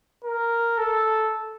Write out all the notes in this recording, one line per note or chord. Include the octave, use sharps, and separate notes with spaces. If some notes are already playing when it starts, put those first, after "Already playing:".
A#4
A4